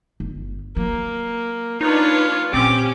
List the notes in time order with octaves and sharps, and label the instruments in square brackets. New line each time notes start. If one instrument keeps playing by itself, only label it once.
[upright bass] G1
[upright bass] F#3 [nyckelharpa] A#3
[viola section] D4 B4 C#5 [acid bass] D#4 [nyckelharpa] F4
[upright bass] A#2 [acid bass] C4 [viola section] C#4 G4 [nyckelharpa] D6